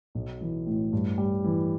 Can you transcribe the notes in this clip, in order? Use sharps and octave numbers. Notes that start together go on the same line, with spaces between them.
B1
E3
A2
G2
G3
E3